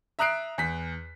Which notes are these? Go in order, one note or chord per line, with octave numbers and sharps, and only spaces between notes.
E5 A#5 D#6 F#6 C7 D7
E2 B6